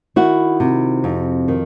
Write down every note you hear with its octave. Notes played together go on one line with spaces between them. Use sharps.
D#3 E4 F#4
C3
F2
D#3